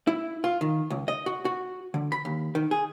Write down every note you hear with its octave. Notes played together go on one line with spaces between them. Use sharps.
E4
F4
D#3
C#2
D#5
F#4
F#4
D3
B5
D#2
D#3
G#4